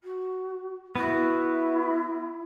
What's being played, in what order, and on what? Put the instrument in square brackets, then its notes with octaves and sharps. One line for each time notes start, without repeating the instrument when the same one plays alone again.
[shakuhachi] F#4
[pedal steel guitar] B3 F#4 [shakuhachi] E4